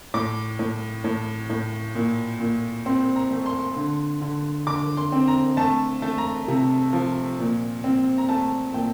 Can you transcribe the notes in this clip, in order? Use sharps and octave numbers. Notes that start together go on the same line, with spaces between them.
A2 D6
A2
A2
A2
A#2
A#2
C4 C6
A#5
A3
C6
D3
D3
D3 D6
C6
C4
A#5
A3 A5
A3
A#5
C3
F3
A#2
C4
A#5
A3 A5
A#2 G5